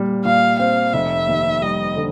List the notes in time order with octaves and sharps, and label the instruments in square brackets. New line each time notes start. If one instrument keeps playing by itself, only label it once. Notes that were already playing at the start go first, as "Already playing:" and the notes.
Already playing: [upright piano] A#2 G3
[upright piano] A#2 [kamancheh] F5
[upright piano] C4 [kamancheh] F5
[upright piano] F1 [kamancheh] E5
[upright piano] D#2
[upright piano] G3 [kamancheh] D#5
[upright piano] D3